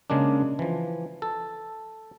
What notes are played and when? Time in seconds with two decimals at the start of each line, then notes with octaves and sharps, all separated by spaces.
0.10 C#3 G#3 A#3 D4
0.59 E3 F3
1.22 A4